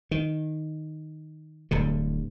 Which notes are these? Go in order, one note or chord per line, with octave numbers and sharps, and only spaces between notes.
D#3
D1 G2 D3